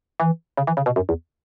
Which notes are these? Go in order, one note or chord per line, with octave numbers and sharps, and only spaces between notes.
E3
C#3
E3
C#3
B2
F#2
E2